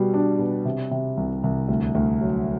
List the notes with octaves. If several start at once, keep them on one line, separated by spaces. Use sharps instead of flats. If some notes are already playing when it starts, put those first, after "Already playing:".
Already playing: B2 G3
D4
B2
C3
C3
C2
C2
D2
D2
F#3